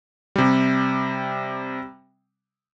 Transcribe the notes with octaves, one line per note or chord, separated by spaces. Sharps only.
C3 G3